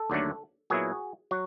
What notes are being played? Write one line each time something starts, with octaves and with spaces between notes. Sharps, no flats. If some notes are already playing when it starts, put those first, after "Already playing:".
Already playing: A4
D#2 D3 F#3 A3 D4
A#2 F#3 B3 E4 F#4 G#4
F#3 F#4